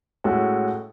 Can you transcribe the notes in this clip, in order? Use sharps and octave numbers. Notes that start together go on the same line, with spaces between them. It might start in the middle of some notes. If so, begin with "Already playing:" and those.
A2 G#3 C#4 F#4 A4